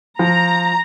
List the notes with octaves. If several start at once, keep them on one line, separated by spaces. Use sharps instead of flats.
F3 A#5